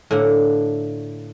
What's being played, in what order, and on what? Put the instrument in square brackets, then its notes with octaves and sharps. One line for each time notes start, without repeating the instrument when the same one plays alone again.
[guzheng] A2 D3 A#3 D4 F#5